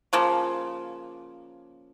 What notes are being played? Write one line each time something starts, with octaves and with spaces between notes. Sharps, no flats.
C#3 F3 A#3